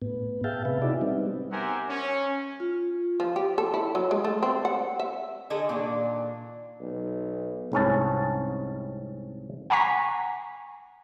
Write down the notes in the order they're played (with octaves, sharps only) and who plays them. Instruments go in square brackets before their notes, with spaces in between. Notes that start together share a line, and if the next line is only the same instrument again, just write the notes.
[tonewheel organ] A2 B3
G#4 E5 F5 G5 A5
C3 B4
D#4 E4 F#4 G#4 D5 E5
G3 B3 C4 D#4
[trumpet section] G4 A#4 C5 E5 F#5 G#5
C#4
[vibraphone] F4
[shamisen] F3
G4
A4
E4
F#3
G#3
A3
C4
F#5
E5
[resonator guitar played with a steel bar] D3 G#4 A4 D#5
A#2 D#3 D4
[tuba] B1
[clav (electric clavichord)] C2 G#2 C#4 A5
[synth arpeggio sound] F#5 G#5 A#5 C#6 B6